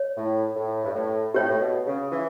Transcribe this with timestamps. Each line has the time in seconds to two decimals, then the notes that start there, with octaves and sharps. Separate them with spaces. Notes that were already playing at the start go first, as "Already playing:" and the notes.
Already playing: C#5
0.17 A2
0.56 A2
0.85 G2
0.95 A2
1.34 A2 G4 C#5 G5
1.50 A2
1.60 B2
1.86 C#3
2.12 E3